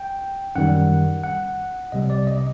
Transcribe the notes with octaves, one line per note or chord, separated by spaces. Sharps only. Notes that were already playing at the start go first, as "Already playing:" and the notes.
Already playing: G5
F#2 D#3 G3 F#5
F#5
C2 C3 G3 D#5
D5
D#5
D#5